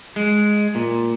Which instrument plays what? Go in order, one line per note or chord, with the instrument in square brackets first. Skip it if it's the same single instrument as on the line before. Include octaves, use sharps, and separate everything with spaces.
[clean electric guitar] G#3
A#2